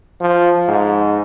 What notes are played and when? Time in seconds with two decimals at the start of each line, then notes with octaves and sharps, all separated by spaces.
0.21 F3
0.68 G#2